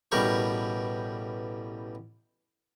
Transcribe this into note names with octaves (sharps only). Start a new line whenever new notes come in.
A1 B2 G3 A#4 G5 C#6